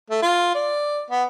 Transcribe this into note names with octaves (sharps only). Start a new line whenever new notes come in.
A3
F4
D5
B3